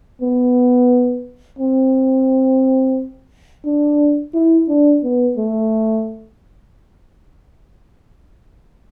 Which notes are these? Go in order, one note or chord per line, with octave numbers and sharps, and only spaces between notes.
B3
C4
D4
E4
D4
B3
A3